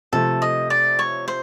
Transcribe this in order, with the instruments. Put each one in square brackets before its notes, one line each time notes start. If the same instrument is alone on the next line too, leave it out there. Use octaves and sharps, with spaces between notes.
[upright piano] C3 F3 A3 [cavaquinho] A4
[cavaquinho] D#5
D5
C#5
C5